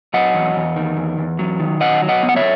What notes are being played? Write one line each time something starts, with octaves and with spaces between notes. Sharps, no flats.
F#3 D#5 F#5
E2
E2
D#3
E2
E2
F#3
D#3
F#3 D#5 F#5
F#3
D#5 F#5
B3
F#5
C#5 E5